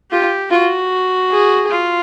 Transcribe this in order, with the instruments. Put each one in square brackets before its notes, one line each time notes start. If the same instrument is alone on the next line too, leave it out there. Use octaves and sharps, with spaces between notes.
[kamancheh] F4 [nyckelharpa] G4
[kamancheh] F4 [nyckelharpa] F#4
[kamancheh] G#4
[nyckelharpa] F4